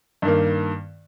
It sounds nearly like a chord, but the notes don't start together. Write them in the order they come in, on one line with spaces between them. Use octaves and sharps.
G2 D#3 A#3